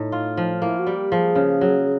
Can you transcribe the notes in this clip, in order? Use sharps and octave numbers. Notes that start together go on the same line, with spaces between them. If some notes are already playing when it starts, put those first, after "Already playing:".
Already playing: A2 D#4
F4
F3
A#3 E4
F#4
G3
G4
F3 G#4
C#3
F#3